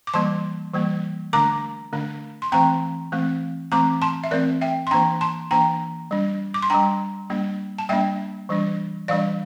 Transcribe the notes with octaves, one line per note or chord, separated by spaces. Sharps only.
D6
E3 G3 A#3 A5 C6
E3 G3 A#3
D3 A3 D4 A#5 D6
D3 A3 D4
C6
E3 A3 C4 G5 A#5
E3 A3 C4
E3 A3 C4 A#5 D6
A5 C6
E5
E3 A3 C4 A#4 D5
E5 G5
C6
E3 A#3 D4 G5 A#5
A5 C6
E3 A#3 D4 G5 A#5
G3 D4
D6
C6
G3 D4 G5 A#5
G3 A#3 D4
A5
G3 A#3 D4 E5 G5
E3 G3 D4
E3 G3 D4 D5 F5